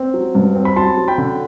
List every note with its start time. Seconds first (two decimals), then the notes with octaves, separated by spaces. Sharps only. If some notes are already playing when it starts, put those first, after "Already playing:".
Already playing: C4
0.14 F#3
0.35 G2
0.55 C4
0.65 B5
0.76 F#3 A5 C6
0.98 F#3
1.08 G5 B5
1.18 D3